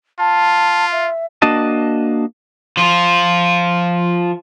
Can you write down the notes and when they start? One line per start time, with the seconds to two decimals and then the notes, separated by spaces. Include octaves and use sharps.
0.19 F4 A5
0.92 E5
1.42 A#3 D4 F#4 D#5 A5
2.77 F3 F4